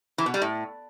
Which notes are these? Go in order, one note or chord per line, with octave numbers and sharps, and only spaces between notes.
E3
B2
G3
A2